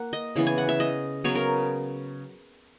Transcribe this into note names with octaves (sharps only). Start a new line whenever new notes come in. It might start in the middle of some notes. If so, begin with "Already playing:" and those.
Already playing: A#3 F#5
D#5
C#3 E3 B3
G#5
F#5
E5
D#5
C#3 F#3 B3 C#5
A#4